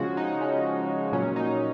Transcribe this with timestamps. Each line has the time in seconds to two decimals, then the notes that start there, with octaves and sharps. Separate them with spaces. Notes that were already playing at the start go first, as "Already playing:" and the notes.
Already playing: C#3 F3 G#3 F#4
0.17 D#4
0.41 C#4
1.12 A#2 F#3 C#4
1.36 D#4